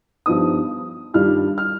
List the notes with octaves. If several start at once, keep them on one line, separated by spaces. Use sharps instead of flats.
G2 F3 B3 D#4 D#6
G2 D#3 G3 D4 F4 F6
F6